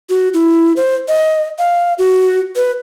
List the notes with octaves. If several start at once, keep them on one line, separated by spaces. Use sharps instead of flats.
F#4
E4
C5
D#5
F5
F#4
B4